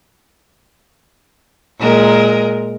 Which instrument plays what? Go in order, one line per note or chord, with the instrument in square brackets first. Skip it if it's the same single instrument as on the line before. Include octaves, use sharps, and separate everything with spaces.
[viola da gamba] A#2 G#3 A#4